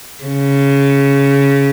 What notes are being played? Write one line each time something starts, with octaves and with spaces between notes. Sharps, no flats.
C#3